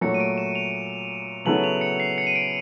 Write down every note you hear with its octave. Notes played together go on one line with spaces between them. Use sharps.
A#2 F#3 A3 C#7
D#7
D7
E7
F7
C#3 F#3 B3 E4 A4 F#7
F7
C#7
C7
C#7
D#7
D7